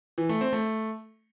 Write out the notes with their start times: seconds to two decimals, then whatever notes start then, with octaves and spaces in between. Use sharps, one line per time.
0.18 E3
0.29 A3
0.41 C4
0.52 A3